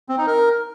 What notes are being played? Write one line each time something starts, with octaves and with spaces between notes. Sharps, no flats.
C4
D#4
A#4